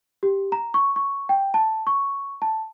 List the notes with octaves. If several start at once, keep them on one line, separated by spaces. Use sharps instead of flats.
G4
A#5
C#6
C#6
G5
A5
C#6
A5